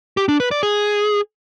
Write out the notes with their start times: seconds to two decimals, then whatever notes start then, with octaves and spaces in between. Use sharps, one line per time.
0.17 G4
0.29 D4
0.40 B4
0.51 D5
0.63 G#4